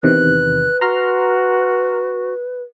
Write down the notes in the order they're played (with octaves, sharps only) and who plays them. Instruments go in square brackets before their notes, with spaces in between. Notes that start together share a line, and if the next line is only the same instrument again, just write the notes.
[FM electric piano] E2 C3 D#3 [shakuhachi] B4 [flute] F#6
[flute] F#4 [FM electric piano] A#5 C6 F6